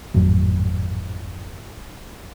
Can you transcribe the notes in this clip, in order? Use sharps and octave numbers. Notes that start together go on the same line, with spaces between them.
G#1 F2 A2 F#3